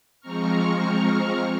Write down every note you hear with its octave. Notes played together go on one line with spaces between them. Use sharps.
F3 G#3 C4 A#5 C#6 F6